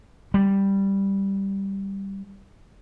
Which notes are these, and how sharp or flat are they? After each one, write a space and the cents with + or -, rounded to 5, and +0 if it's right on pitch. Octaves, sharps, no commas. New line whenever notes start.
G3 +0